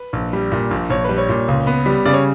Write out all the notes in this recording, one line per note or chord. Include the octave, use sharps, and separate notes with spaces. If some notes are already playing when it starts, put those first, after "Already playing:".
Already playing: B4
A#1
G3
A#2
A#1
A#1 C#5
G3 B4
C#5
A#2
C#2
B3
G3
C#3 D5
C#5